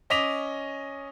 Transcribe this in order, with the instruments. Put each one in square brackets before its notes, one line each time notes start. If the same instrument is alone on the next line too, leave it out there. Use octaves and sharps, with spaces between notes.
[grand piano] C#4 D#5 D6 B6 F7